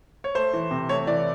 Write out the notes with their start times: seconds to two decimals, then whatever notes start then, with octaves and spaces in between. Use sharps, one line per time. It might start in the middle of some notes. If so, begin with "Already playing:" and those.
0.24 C#5
0.35 A3 C5
0.53 E3
0.71 C3
0.89 A3 C#5
1.07 E3 D5